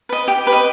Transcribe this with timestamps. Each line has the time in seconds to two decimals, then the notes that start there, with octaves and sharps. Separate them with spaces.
0.09 B4 D#5
0.28 G4
0.47 B4
0.53 D#5